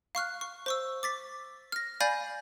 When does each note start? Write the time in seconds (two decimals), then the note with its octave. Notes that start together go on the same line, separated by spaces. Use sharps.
0.15 F5 C#6 F6 F#6
0.41 C#6
0.66 C5 C#6 E6
1.03 D6 A6 B6
1.72 F6 A#6
2.01 D5 F5 G#5 B5 G6 A6